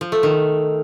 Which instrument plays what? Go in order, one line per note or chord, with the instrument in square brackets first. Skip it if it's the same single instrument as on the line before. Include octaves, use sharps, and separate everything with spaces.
[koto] F3
A3
D#3